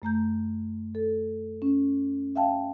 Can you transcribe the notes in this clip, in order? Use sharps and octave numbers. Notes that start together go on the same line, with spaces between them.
F#2 A3 A#5 G6
A4
C#4
E5 F5 G5 A5